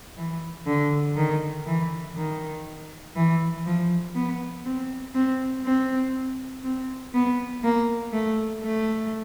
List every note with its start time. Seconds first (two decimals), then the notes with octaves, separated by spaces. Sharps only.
0.17 E3
0.67 D3
1.17 D#3
1.67 E3
2.17 D#3
3.16 E3
3.66 F3
4.15 B3
4.65 C4
5.15 C4
5.65 C4
6.64 C4
7.14 B3
7.64 A#3
8.13 A3
8.63 A3